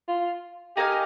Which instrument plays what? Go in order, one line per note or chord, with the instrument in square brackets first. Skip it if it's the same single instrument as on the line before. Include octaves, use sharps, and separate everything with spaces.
[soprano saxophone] F4
[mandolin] D#4 A#4 F5 G#5 [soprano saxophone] G4